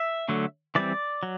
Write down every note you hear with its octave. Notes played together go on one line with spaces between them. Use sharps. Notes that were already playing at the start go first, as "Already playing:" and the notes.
Already playing: E5
D3 F#3 A3
E3 G3 C4 D5
F#3